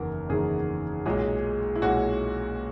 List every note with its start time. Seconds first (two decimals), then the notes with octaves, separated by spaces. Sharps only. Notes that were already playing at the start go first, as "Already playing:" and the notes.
Already playing: F#1 E2 D#3 A#4
0.29 F#1 E2 D#3 G#4
1.06 B1 A#2 G#3 G#4
1.76 E4
1.82 B1 A#2 G#3 F#4